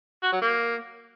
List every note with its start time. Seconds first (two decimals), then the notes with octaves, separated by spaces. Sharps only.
0.23 F#4
0.32 F#3
0.42 A#3